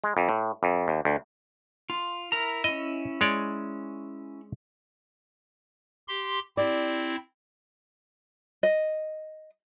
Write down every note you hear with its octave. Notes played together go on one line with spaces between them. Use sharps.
G#3
F2
A2
F2
D#2
D2
F4
E4 A#4 A#5
C#4 E4 D#5
G#3 C#5 D5
G4 C6
C4 E4 G4 D5
D#5